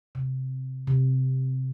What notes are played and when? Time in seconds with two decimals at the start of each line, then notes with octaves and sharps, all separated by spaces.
0.15 C3
0.87 C3